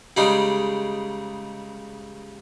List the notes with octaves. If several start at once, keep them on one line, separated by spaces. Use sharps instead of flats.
C#3 G3 G#3 D#4